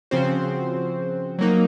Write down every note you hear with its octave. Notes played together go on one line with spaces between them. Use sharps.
C#3 F3 C4 F#4 C5
F#3 A#3 D#4